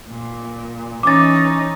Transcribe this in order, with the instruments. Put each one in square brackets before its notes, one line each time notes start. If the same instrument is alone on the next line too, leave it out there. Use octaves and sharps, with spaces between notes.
[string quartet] A#2
[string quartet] E3 C#4 D#4 [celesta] D6 A6